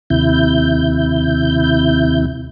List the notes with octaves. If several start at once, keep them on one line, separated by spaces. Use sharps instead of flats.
D#2 C3 E4 G6